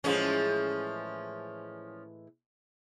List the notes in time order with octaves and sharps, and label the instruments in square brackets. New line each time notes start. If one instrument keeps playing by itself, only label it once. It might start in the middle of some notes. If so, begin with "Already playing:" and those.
[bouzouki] A2 E3 G#3 [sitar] F3 C#4